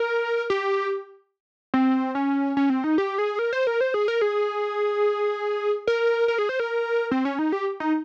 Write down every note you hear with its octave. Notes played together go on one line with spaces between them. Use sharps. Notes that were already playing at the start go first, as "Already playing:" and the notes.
Already playing: A#4
G4
C4
C#4
C#4
C4
D#4
G4
G#4
A#4
C5
A#4
C5
G#4
A#4
G#4
A#4
A#4
G#4
C5
A#4
C4
C#4
D#4
G4
D#4